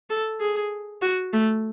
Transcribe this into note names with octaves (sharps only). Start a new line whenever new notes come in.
A4
G#4
F#4
A3